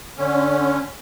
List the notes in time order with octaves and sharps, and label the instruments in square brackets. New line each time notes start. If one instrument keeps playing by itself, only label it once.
[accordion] D3 C#4